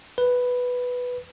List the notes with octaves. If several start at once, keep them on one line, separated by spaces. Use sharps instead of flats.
B4